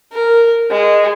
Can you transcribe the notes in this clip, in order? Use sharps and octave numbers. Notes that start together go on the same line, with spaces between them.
A#4
G#3